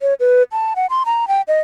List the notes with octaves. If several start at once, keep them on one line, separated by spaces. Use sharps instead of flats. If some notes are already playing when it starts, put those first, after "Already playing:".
C#5
B4
A5
F#5
C6
A#5
G5
D#5